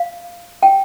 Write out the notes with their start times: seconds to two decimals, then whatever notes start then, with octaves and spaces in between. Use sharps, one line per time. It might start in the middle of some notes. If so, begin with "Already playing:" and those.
Already playing: F5
0.63 G5